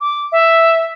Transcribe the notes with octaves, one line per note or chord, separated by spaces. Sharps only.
D6
E5